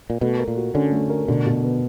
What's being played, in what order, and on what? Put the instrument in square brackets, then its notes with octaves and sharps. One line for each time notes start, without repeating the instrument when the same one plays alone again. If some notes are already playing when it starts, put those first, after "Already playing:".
[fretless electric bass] A#2
[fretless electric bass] B2 [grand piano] A3
[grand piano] A#4
[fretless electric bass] A#2
[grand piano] F#4
[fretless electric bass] D3 [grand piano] C#4
[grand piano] A3
A#4
[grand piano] B2 [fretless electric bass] D3
[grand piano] B2
B3